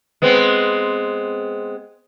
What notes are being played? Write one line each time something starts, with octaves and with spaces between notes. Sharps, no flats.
G#3 B3 C4